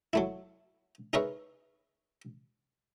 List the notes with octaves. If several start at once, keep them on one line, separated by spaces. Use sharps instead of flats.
F#3 A3 E4
D#4 G#4 A#4 B4 C#5 E5